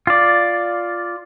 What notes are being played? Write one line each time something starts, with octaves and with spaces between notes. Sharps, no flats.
F4 D5